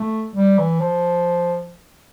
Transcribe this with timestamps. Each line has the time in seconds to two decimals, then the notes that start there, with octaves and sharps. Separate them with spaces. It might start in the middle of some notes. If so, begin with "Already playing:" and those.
Already playing: A3
0.36 G3
0.59 E3
0.80 F3